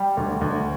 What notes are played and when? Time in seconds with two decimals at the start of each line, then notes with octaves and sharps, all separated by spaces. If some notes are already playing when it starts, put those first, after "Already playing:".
Already playing: G3 G5
0.17 D2
0.41 D2